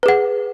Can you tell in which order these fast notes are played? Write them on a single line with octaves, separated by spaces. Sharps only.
B4 G#4 F#5